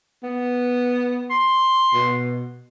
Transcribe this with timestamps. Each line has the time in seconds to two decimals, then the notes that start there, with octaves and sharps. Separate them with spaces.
0.23 B3
1.31 C6
1.93 B2